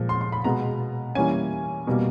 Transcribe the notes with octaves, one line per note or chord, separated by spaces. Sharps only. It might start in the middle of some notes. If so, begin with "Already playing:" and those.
Already playing: A#2 F3 G#3
C6
C6
B5
B2 G#3 B3 A#5
E3 G3 A#3 C#4 G#5
B2 G3 A#3